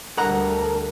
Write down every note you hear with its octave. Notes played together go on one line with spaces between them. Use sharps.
D2 G3 A4 A#4 F#5 A#5